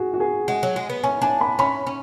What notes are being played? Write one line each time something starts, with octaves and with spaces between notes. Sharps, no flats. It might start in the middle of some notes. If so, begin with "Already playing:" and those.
Already playing: F#4 G#4
F#4
G#4
G#3 F#5
F#3
G#3
B3
C#4 G#5
D4 G#5
B5
C#4 B5
C#4